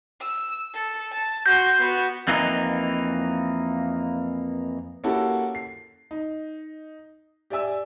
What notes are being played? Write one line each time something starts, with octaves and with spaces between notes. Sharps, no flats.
E6
A4
A5
F#4 C6 G6
B3 F#4
F2 E3 A#3 D#4
A#3 C#4 E4 F#4 G4 A4
C7
D#4
G4 D5 E5 G#5 E6